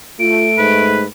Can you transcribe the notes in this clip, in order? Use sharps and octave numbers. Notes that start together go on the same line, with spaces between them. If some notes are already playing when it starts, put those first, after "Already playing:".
A3 F4 D7
G#2 B4